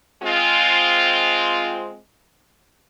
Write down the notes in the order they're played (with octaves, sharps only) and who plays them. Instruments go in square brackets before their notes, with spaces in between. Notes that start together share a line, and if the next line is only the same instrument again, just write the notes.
[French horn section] G#3 C4 F4